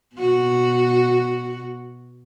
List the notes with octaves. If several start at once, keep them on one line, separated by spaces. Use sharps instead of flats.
B2 F#4